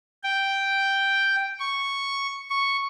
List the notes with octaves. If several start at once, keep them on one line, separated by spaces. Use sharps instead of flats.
G5
C#6
C#6